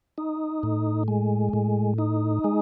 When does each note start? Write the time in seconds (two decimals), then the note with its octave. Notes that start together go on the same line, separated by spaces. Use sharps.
0.18 D#4
0.63 A2
1.08 G#3
1.53 A2
1.98 D#4
2.44 G#3